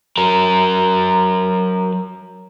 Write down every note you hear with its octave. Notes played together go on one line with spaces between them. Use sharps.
F#3 A#4